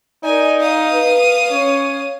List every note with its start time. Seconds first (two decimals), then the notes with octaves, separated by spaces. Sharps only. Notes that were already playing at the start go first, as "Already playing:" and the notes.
0.24 D#4 A#4 D5 G#5
0.60 F5 D#6
0.92 B4
1.51 C#4 C#5